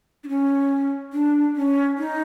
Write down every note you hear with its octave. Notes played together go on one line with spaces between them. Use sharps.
D4
C#4
D4
C#4
D#4